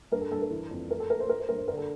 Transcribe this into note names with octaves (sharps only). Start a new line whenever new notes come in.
G2 A#4
A4
G2 A4
A#4
E3
F2
A3 A#4
A4
A3 A#4
C5
A3 A#4
C5
G2 A#4
C5
D3 A#4
A4